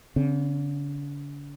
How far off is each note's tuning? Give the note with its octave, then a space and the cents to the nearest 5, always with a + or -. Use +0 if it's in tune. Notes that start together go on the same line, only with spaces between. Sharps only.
D3 -45 C4 +10